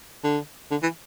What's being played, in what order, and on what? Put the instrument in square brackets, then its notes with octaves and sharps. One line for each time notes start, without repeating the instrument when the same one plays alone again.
[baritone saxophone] D3
D3
E3